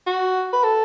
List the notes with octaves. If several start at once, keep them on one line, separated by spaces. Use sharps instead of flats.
F#4
B4
A4